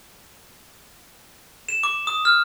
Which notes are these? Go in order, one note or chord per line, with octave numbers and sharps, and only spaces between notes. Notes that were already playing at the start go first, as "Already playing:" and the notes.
E7
D6
D#6
F6